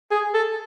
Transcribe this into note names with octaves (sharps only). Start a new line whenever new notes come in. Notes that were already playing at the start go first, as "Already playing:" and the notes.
G#4
A4